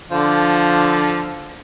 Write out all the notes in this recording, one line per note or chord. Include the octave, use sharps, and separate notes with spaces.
D3 F3